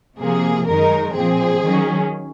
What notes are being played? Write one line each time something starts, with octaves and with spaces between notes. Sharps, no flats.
C3 F3 A#3 G#4
F#2 D#3 G#3 D#4 A#4
A#2 F3 C4 G#4
D#3 F#3 C#4